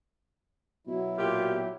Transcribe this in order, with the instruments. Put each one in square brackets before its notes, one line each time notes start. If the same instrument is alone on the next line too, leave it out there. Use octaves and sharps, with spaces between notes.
[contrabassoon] B2 [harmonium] F#3 E4
[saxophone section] A#2 F4 G4